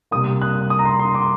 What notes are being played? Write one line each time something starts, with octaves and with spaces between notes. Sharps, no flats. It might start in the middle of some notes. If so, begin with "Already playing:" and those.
C3 G3 A#3 D#6
F#6
D#6
A#5
C6
C6
D6